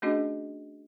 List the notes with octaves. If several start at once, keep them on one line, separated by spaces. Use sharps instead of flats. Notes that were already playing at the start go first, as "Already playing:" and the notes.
A3 C#4 D4 F#4 G#4 D#5